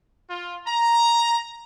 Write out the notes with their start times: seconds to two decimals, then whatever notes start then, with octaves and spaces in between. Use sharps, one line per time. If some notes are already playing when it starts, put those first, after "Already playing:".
0.30 F4
0.67 A#5